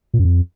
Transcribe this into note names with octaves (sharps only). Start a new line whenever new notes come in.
A#2
F#2
F2